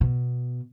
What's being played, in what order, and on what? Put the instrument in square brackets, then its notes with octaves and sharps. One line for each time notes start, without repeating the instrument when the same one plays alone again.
[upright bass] B2